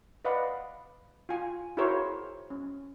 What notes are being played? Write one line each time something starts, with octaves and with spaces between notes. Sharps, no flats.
B4 D5 D#5 F5 F#5 B5
F4 G#5
E4 F#4 G#4 A#4 C5 C#5
C#4